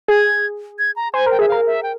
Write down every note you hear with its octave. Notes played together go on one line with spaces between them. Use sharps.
G#4 G#6
G#6
A#5
C5 G#5
A#4 G5
G#4 E5
A#4 F5
E5
G5